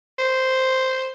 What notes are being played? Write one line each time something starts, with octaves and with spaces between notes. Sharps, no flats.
C5